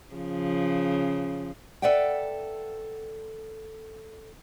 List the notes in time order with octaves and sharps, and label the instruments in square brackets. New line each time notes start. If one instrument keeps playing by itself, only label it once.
[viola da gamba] C#3 F3
[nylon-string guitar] A4 B4 D5 E5 F#5 G5